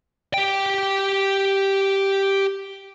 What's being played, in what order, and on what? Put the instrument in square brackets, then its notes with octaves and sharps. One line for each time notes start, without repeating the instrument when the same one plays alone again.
[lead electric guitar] G4 G5